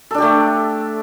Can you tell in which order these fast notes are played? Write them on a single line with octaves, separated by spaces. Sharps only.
A4 D4 G4 A3